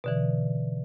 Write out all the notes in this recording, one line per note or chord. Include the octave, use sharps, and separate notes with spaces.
B2 D3 E3